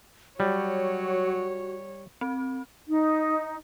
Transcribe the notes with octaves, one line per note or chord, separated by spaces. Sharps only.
F#3 G3 F#4 C#5
C4
D#4